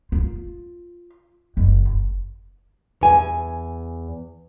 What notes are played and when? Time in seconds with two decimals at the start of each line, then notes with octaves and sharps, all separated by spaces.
0.12 F4
1.57 F#1
3.01 E2 G#5